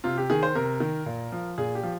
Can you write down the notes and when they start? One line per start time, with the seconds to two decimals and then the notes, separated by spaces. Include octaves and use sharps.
0.04 C3 F4
0.17 G4
0.30 D#3 G#4
0.43 C5
0.55 C3 A#4
0.80 D#3
1.06 A#2
1.32 F3
1.58 A#2 G#4
1.75 G4
1.83 F3